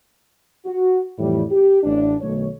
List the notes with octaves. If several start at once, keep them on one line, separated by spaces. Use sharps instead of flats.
F#4
F2 A2 E3 G3
G4
A1 D4
B1 D#3 A3 C#5